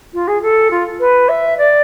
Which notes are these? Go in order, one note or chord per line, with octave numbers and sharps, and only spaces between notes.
F4
G#4
A4
F4
B4
E5
D5